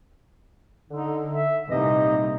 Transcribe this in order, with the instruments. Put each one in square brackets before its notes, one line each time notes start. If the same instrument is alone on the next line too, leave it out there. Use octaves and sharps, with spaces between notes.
[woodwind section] D3 [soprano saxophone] D#4
[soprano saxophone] E5
[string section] C2 A#2 [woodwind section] B3 G4 D#5 [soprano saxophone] D#4